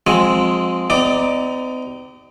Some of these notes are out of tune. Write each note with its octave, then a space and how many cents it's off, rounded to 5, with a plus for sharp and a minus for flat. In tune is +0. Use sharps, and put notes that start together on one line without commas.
F3 +40 G#3 +0 C4 +0
C4 -45 D#4 +10 D5 +5